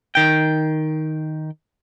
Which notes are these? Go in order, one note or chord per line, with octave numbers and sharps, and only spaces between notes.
D#3 G5